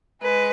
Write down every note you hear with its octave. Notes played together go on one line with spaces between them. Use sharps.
G#3 B4